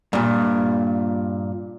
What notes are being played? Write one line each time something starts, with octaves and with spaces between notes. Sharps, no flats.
G2 A#2